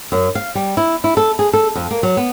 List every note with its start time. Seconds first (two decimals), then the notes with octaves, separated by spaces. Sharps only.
0.12 F#2
0.35 F5
0.55 G3
0.77 E4
1.04 E4
1.17 A4
1.39 G#4
1.53 A4
1.75 F2
1.91 A#3
2.03 F#3
2.17 B3